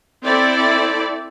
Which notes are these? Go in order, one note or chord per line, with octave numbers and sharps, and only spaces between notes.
C4 E4 A4 D5